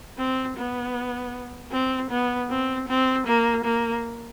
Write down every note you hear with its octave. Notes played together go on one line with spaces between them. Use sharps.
C4
B3
C4
B3
C4
C4
A#3
A#3